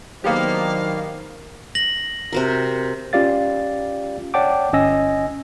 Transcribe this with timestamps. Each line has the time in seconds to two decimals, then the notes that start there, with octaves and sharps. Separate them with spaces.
0.24 D#3 F#3 A#3 B3 D4 G4 C5 F5
1.75 A#6 F#7
2.33 C3 F#4 A#4
3.13 C#4 F4 G4 D5 F5 A6
4.34 C#5 D5 F#5 G5 A5 D6
4.73 G1 C#4 D#5 G#5 E6 A#6